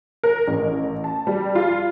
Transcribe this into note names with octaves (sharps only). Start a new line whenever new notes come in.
A#4
A1
A5
G3
F4